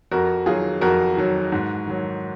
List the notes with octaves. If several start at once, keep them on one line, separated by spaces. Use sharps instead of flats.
F2 F#4 A#4
D#3 F#3 F4 G#4
F2 F#4 A#4
D#3 F#3
G#2
D#3 F#3